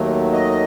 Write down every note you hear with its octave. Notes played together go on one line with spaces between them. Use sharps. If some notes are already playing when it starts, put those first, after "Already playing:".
Already playing: D#2 D#3 F#3 A3
D#5